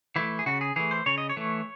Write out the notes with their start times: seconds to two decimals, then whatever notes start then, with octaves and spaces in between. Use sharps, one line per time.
0.16 E3 A3 E4
0.39 G#4
0.46 C#3 F#4
0.61 G#4
0.76 E3 A3 G#4
0.91 C5
1.06 C#3 C#5
1.18 D#5
1.29 C#5
1.37 E3 A3